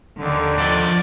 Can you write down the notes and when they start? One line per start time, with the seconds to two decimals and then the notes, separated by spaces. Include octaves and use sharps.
0.20 D#2 D3
0.58 F3 D5 D#5